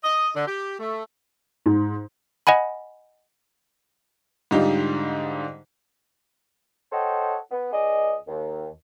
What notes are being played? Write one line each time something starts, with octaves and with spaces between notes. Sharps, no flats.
D#5
D3
G4
A3
G#2
D#5 F#5 G#5 B5
G#2 D3 G3 D#4 F4 G4
A4 C5 C#5 D#5 F#5 G5
B3
C#2 G#4 D5 D#5
D#2